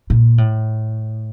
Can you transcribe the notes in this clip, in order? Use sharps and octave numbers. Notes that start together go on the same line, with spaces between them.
A#2
A2